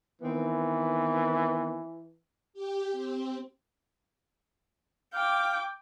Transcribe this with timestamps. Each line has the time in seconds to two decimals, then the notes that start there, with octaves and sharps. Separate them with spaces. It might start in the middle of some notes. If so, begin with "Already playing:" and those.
0.21 D#3 E3 B3 C4
2.54 G4
2.92 C4
5.13 F5 G5 D6